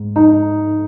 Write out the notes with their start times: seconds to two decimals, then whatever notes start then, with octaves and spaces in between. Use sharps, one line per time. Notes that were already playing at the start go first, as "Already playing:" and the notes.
Already playing: G#2
0.16 D#4